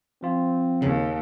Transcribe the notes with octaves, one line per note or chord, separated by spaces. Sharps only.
F3 C4 F4
D#2 C#3